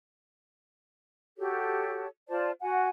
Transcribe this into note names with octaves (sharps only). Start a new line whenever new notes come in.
F#4 G4 A4 C#5
F4 C5 D5 A5
F#4 F#5 G#5